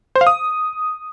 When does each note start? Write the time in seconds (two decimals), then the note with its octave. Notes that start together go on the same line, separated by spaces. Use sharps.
0.16 C5
0.21 F5
0.27 D#6